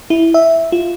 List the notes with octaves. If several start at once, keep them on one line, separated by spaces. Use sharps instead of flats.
E4
E5
F4